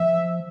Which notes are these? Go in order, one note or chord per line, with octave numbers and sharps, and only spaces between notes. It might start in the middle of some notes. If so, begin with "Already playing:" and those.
Already playing: F3 E5